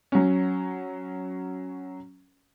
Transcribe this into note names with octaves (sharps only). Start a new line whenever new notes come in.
F#3 C#4